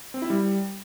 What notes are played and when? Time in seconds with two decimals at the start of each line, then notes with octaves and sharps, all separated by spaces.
0.14 C4
0.22 E4
0.30 G3